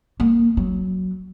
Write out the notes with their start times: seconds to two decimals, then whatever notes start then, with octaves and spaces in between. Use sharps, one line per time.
0.20 A#3
0.57 F#3